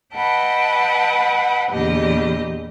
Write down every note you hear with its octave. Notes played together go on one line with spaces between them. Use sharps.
B4 D#5 E5 F#5 G5 A5
E2 A#2 D3 G4 D#5